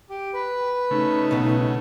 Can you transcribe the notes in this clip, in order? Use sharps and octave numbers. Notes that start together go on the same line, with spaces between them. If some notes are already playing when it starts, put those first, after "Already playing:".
G4
B4
C#3 A3 D#4
B1 B2 B3